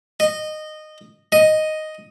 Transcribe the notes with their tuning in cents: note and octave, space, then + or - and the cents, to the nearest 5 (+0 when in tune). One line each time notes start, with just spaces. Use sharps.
D#5 -15
D#5 +0